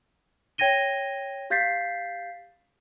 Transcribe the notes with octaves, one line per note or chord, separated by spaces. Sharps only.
C#5 G5 G#6 A#6 D#7 G7
G4 F5 G6 A6 B6 C7